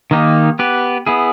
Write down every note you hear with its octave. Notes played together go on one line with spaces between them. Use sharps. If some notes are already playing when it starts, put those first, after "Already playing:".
D#3 A#3 D#4 G4
B3 G4 B4
B3 E4 G#4